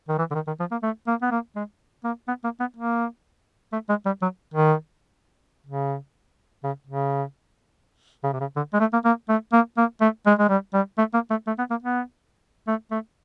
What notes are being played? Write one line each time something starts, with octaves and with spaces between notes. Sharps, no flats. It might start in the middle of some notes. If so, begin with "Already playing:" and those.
D#3
E3
D3
D#3
D#3
F3
A#3
A3
A#3
B3
A#3
G#3
A#3
B3
A#3
B3
A#3
A3
G#3
G3
F#3
D#3
C#3
C#3
C#3
C#3
C3
C#3
D3
G#3
A3
A#3
A#3
A3
A#3
A#3
A3
G#3
G#3
G3
G3
A3
A#3
A3
A3
B3
A#3
B3
A3
A3